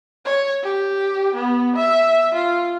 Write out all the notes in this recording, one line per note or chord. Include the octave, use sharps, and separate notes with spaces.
C#5
G4
B3
E5
F4